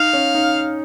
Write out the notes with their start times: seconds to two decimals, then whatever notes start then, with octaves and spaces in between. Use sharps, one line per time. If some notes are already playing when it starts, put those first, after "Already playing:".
Already playing: D#4 F5
0.13 C#4
0.35 D#4